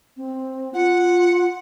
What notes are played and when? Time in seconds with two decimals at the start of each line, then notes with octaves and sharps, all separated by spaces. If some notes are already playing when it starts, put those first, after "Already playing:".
0.17 C4
0.74 F4 F#5